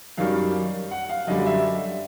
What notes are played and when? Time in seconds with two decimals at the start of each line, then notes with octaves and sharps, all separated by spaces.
0.17 F#2 D#3 G3 F5
0.91 F#5
1.09 F5
1.27 F#2 D3 G3 D#5
1.46 E5